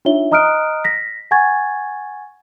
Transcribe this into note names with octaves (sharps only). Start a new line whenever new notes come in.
D4 D#4 F4 C#5 E5 G7
D#5 A#5 D#6 F6 F#6 D7
A#6 B6
F#5 G#5 C#6 G#6 A6